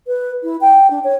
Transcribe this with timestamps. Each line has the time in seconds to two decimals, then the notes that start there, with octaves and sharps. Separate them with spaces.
0.07 B4
0.43 E4
0.61 G5
0.90 D4
1.04 C#5